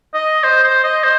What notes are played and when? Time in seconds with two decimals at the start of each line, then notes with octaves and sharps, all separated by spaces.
0.14 D#5
0.44 C5
0.64 C5
0.84 D#5
1.04 C5